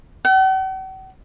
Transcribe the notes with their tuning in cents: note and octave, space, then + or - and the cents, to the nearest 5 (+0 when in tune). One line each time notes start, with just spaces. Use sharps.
F#5 +45